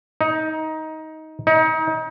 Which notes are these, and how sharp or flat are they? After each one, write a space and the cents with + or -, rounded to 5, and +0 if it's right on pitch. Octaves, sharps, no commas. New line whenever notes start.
D#4 +15
D#4 +30